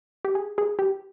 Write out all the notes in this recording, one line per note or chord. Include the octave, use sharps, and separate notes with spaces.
G4
G#4
G#4
G4